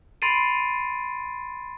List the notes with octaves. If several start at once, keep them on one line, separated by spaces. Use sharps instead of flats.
B5 C6 A6 C7 D7 D#7